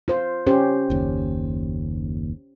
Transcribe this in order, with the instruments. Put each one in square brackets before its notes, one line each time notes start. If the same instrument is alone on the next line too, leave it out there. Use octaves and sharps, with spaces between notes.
[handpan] F4 C5
C#4 G4 C5
[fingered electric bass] F#1 D#2